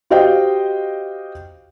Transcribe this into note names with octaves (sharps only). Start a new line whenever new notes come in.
F#4 G4 C5 D#5 F5 G5